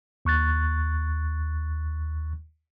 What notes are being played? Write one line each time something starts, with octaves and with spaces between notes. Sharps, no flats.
D#2 C#6 F#6 A6